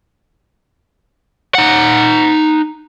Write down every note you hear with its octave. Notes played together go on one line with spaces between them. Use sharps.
D#4 F#5